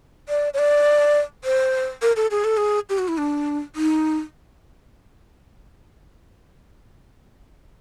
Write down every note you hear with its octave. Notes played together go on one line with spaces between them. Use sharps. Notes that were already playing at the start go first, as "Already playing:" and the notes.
D5
C#5
D5
C5
A#4
A4
G#4
A4
G#4
G4
F#4
E4
D4
D#4